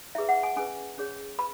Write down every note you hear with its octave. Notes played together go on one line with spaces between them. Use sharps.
E4 G#4 B4 E5
F#5
G#5
C#4 G#4 B4 G#5
C#4 G#4 C#5
B4 B5